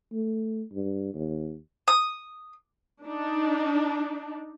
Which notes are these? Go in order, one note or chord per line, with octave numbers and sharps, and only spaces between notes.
A3
G2
D#2
D#6
D4 D#4